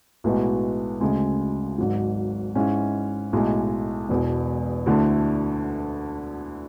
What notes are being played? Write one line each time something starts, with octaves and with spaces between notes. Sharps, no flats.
B1 A2 G#3 B3 F#4
D2 C#3 G#3
G#1 G#2 F#3
G#2 G#3 C#4 E4
B1 A2 G#3
E1 E2 B2
D2 D3 A3 E4